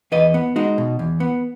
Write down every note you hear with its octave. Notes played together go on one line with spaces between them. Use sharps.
E2 B4 D#5
B3
G#3 D#4 F#4
B2
E2
B3